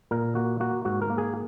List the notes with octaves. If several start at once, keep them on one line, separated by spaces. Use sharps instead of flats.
A#2 A#4
A#3 F#4
A#3 F#4
G#2 F#4
A#4
A#3
G#4